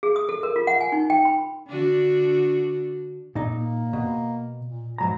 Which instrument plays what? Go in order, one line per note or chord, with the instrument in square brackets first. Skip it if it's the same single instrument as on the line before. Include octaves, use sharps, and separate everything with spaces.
[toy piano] G#4
D#6
A4
A#4
F4
F#5
G#5
D#4
G5
B5
[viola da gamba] D3 D4 F#4
[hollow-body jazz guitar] A#2 D#4
[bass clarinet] A#3
[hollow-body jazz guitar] B2
[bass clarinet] A#2
[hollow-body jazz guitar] G#2 F#3 A#5 [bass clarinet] F3